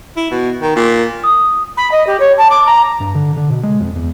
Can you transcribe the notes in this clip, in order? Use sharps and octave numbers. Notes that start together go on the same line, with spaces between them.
E4
B2
D#3
A#2
D#6
B5
D#5
G4
C#5
A5
D6
A#5
G2
D3
D3
B2
G#3
F2
E2